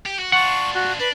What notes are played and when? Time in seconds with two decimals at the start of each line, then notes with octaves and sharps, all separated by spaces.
0.06 G4
0.19 F#4
0.32 D4 F4 F#5 C#6
0.75 F#4
1.00 D4 B4